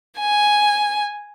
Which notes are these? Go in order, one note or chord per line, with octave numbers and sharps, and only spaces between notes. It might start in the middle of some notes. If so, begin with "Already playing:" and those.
G#5